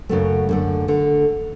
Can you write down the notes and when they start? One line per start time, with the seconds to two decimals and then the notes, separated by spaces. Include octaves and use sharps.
0.09 F#2 C#3 F#3 A3
0.49 F#2 D3 A3
0.88 D3 A3